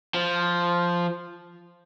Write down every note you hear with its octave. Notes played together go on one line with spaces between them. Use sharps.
F3